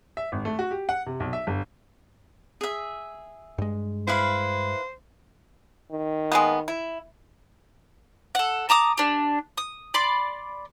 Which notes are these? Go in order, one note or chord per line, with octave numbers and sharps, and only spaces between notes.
E5
G#1
A3
F#4
G4
F#5
C3
B1
E5
G1
G#4 E5
G2 G#3
E4 B4 C5 F5
D#3
G#3 A#3 B3
E4
A4 F#5
A5 A#5 D6 D#6
D4 G4
D#6
D5 B5 C6 D6